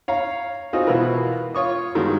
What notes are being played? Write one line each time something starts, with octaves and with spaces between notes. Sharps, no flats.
C#5 F5 A#5
C4 D#4 F4 F#4 G#4
B2 E3 F4 F#4 A#4 B4
F4 C#5 C#6 D#6
G2 D#3 G#3 F#4